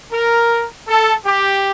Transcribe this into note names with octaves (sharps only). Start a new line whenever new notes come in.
A#4
A4
G4